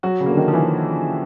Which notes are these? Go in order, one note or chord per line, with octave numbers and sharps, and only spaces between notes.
F#3 F#4
C#3
D3 A#3
D#3
F3
E3